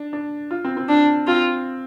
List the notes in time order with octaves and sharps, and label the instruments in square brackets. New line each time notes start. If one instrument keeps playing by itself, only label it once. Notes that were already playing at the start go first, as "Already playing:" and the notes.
Already playing: [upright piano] D4
D4
F4
C4
C4
[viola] D4
[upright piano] C4 [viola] F4